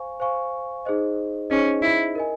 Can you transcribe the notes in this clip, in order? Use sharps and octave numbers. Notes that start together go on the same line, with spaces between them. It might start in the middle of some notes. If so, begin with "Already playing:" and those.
Already playing: C5 F5 G#5 C#6
C5 F5 G#5 C#6
D#4 G#4 C5 D#5
C#4 D#4 G#4 C5 D#5
E4
A#4 D#5 G#5